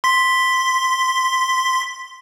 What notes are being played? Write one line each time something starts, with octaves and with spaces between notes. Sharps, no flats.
C6 B6